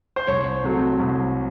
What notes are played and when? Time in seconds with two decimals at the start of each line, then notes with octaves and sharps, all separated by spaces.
0.16 C5
0.27 C2 C#5
0.64 C3 F#3 A3
1.00 C2